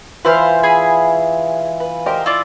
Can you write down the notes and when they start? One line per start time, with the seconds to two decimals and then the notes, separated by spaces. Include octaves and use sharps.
0.25 E3 E4 F4 B4 C5 F5
0.63 G#4 G#5 B5
1.80 B4
2.06 G4 A#4 C5 D#5
2.26 E4 F4 D5